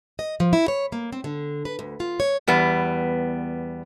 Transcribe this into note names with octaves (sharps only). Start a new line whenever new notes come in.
D#5
F3
E4
C#5
A#3
C4
D3
B4
D2
F4
C#5
E2 G3 B3